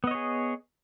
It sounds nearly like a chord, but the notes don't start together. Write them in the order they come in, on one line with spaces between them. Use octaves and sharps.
B3 D#5 C#5 G#4